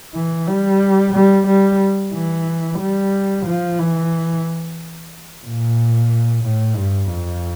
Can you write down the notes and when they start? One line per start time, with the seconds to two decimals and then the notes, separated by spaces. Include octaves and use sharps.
0.14 E3
0.47 G3
1.13 G3
1.47 G3
2.13 E3
2.79 G3
3.46 F3
3.78 E3
5.45 A#2
6.44 A2
6.76 G2
7.10 F2